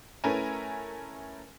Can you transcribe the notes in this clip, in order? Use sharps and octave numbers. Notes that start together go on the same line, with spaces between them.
A3 C#4 E4 A#4 B4 G#5